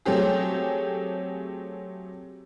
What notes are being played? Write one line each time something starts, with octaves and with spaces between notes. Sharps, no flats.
F#3 A3 C4 G4 G#4